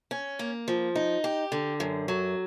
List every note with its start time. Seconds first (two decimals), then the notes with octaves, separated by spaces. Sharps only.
0.11 C#4
0.39 A#3
0.68 F3
0.96 D#4
1.24 G4
1.52 D3
1.80 F#2
2.08 F#3